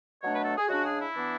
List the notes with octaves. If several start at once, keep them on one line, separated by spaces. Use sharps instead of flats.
B2 F#3 A3 D4 C#5
B4
A4
G#4
C#3 G#3 D4 F#4
G#4
E4
E3 B3 D4